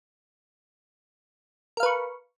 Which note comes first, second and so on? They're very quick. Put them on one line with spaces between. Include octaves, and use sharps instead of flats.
A#4 F5 B4 C#6